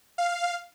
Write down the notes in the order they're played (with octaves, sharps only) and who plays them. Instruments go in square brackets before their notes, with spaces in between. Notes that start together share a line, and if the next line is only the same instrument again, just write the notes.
[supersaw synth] F5